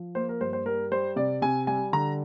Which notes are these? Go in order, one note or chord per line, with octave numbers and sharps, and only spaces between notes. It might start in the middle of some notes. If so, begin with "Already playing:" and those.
Already playing: F3
A#3 C5
A#4
G2 C5
C5
G3 A#4
G3 C5
C3 D5
C3 G#5
G3 G#5
D3 A#5